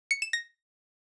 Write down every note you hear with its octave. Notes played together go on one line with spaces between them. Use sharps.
C#7
E7
A#6